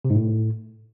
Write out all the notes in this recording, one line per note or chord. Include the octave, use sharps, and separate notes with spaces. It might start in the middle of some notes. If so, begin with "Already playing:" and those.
C3
G#2
A2